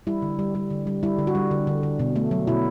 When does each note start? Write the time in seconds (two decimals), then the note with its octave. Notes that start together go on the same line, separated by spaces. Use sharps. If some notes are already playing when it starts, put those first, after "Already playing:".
0.07 G3 E4
0.22 D3
0.39 G3
0.55 G3
0.70 D3
0.87 G3
1.03 G3 E4
1.18 D3
1.27 F#4
1.35 G3
1.51 D3
1.67 D3
1.83 D3
1.99 B2
2.16 A3
2.31 F#3
2.47 B2 E4